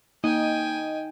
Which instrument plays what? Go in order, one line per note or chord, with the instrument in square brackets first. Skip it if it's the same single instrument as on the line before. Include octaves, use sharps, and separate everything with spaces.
[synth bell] A#3 [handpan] D#4 [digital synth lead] D#5 [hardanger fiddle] G5 G#5